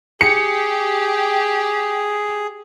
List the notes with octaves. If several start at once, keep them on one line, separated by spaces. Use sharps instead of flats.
G4 G#4 C#7